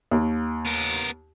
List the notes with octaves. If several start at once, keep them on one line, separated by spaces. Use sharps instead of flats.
D#2
B3 A#4